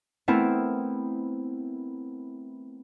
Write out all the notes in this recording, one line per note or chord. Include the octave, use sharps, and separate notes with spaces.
A3 B3 C4 E4 A#4